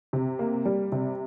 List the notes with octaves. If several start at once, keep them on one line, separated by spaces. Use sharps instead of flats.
C3
A#3
G3
C3